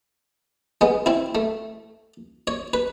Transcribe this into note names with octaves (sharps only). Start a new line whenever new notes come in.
G#3 B3
C4 E4
A3
C#5
B4